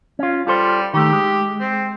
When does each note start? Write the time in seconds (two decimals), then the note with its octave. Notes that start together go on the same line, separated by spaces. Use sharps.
0.19 C#4 F4
0.47 G3 F4 A4 C5
0.94 D#3 A3 G4
1.13 G#3
1.60 C4